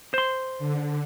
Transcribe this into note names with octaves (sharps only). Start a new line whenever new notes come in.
C5 C6
D3